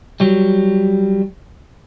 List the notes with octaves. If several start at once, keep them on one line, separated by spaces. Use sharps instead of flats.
F#3 G3